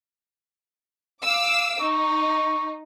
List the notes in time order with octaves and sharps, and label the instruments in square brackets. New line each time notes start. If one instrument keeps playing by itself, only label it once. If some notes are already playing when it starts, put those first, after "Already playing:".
[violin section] F5 D6 E6
[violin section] D#4 [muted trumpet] C#6